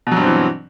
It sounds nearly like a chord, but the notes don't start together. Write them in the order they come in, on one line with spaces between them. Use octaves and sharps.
B2 F#3 G2 C4 E3